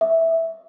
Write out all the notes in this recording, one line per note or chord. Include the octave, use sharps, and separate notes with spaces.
E5